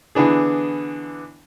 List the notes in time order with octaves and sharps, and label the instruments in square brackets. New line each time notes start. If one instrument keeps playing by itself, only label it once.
[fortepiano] D3 E3 B3 D4 G#4